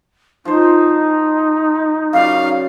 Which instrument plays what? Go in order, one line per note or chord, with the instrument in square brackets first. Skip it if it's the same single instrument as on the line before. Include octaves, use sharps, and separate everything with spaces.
[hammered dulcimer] F3 C5 [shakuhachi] D#4
[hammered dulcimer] F#2 C#3 D5 [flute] F5